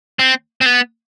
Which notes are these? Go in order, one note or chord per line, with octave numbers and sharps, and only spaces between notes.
C4
C4
B3